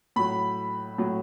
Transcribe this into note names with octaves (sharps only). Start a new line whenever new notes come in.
A2 F#3 B5
A2 F#3